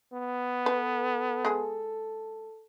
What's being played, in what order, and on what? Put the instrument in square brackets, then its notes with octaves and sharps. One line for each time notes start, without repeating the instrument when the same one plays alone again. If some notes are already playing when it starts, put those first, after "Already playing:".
[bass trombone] B3
[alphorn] A4 [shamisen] B4
[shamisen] G#3 G#4